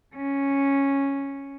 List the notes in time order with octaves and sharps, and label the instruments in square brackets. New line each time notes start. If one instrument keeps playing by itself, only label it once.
[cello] C#4